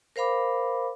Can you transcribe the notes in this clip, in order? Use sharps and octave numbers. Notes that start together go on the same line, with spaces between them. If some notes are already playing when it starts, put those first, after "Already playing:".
A#4 C5 F5 B5 D6